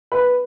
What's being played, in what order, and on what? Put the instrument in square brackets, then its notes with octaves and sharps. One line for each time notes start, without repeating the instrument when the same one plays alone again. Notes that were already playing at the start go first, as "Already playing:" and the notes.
[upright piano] B4